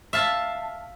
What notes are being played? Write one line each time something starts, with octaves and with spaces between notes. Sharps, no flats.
E5 F5 A5